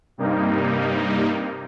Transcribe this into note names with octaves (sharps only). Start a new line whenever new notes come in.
G2 C3 G3 A#3 D#4